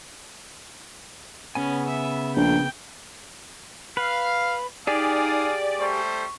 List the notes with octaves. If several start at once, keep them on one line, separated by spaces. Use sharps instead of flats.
C#3 B3 C#4 G#5
E5
A#1 G5
B4 F5
D#4 G4 G#4 D5 F5 G#5 D#6
G3 A3 C5 C#6